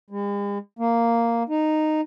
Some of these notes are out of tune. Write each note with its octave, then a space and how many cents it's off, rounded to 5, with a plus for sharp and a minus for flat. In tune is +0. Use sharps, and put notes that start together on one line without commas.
G#3 -45
A#3 -5
D#4 -10